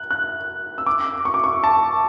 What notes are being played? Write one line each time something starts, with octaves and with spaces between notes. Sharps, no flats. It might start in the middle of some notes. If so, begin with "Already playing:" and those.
Already playing: F#6
F#6
E6
D6
C#6
D6
C#6
A5